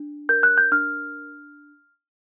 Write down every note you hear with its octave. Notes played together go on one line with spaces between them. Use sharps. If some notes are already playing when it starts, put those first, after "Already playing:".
Already playing: D4
A#4 G6
F#6
G6
D4 F6